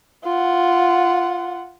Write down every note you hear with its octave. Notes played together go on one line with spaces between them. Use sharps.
F4 F#5